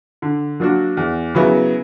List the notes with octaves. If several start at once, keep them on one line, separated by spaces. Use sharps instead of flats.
D3
F#3 A#3 D4 F#4
E2
C#3 F#3 B3 E4